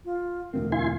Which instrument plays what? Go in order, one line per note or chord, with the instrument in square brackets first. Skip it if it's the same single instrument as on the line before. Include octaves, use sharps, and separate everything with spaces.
[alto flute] F4
[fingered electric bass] E1 D2 C4 [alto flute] A#4
[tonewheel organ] E4 G#5 C6 [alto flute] F5